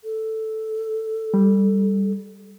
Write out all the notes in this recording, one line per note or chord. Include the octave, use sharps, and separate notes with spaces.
A4
G3